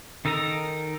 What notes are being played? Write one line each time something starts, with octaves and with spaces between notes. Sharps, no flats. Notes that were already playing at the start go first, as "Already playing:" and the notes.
D#3 D#4 A4 A#4 A#5